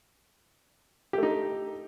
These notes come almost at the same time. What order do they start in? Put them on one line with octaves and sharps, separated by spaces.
G4 A3 D#4